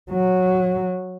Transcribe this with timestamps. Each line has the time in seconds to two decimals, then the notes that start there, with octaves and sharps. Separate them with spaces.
0.12 F#3